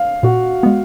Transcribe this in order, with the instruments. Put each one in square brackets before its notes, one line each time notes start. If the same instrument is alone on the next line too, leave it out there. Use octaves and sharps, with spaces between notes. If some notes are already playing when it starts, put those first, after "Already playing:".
Already playing: [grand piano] F5
[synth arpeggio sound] A#2 [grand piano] F#4
[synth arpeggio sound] G#3 B3